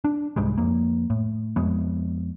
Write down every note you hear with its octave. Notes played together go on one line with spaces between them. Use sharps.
D4
C2 G#2 G3 G#3
F2 A#3
A2
F2 G#3 B3